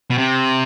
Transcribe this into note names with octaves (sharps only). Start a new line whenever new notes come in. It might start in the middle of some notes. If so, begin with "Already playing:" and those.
B2
C3